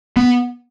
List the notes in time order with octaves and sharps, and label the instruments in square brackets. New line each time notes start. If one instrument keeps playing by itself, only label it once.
[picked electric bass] B3